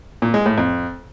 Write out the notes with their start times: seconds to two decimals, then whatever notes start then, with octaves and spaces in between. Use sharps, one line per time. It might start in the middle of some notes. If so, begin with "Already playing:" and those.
0.22 A#2
0.34 G#3
0.46 A2
0.58 F2